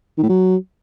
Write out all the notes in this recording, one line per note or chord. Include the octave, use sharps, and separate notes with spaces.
D#3
A2
F#3